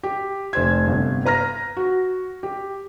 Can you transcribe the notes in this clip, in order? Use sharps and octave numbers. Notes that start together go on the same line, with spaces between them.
G4
F1 C5 G#6
G1 C3
B4 A#5 F6 A#6
F#4
G4